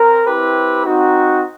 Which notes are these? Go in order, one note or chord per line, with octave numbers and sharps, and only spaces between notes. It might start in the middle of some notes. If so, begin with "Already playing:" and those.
Already playing: C4 A#4
C4 E4 G4 B4
C4 D#4 F#4